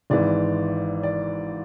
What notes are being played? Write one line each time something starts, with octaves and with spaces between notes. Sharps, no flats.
G#1 G#2 E3 D5
D5